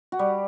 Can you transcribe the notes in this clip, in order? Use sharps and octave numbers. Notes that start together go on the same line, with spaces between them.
F#4
G3 G4